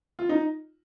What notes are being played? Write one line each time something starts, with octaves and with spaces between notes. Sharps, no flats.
F4
D#4